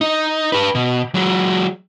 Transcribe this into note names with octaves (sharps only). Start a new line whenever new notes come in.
D#4
G4 B4
B2
F#3 G#3